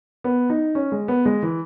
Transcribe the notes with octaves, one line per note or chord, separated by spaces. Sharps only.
B3
D#4
C#4
G#3
B3
G#3
E3